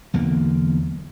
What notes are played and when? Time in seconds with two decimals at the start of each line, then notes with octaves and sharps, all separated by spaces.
0.14 B1 E2 D3 A#3